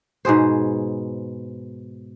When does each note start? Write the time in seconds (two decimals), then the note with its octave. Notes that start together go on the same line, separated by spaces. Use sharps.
0.25 G#2 B2 G#4 C5